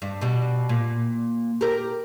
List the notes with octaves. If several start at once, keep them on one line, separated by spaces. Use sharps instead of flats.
G2
B2 G3
A#2
G4 A#4